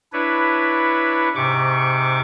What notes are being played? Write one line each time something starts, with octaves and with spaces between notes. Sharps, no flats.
D4 E4 B4 C#5
G#2 C3 C#6 D6